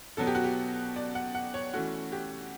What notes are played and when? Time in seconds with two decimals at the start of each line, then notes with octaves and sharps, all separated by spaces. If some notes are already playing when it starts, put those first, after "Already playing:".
0.17 B2 F#3 B3 A4
0.27 G4
0.35 F#4
0.44 G4
0.96 D5
1.15 F#5
1.35 F#5
1.54 C#5
1.73 E3 A3 C#4 F#4
2.12 G4